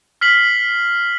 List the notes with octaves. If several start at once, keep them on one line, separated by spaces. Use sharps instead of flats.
F6 B6 C7 F#7